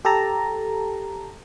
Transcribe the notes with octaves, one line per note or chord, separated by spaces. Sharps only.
G4 A4 A5 A#5